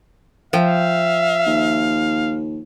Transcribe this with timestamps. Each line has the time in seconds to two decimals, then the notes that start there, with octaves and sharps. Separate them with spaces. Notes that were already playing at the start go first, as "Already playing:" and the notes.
0.53 F3 E5 F5 G5
1.47 D#2